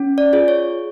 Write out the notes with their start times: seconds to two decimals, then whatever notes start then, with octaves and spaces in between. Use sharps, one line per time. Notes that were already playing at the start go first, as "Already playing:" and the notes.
Already playing: C#4
0.18 D5
0.33 F4 G#4
0.48 C#5